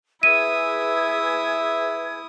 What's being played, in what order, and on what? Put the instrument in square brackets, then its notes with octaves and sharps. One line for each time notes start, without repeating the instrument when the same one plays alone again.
[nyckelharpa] E4 D#6 [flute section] G#4 B4 G#6 [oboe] E5 [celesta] D#7